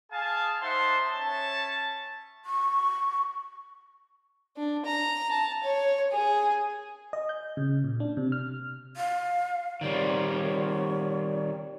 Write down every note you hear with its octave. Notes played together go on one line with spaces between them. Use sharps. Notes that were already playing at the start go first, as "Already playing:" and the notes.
G#4 F5 G#5 A5
D#4 C5 E5 F#5 A5 C6
C#4 C#5 E5 A5
C#6
D4
A#5
A5
C#5
G#4
D#5
G6
C#3
A#2
D4
C3
F6
F5
D#3 G3 C4 C#5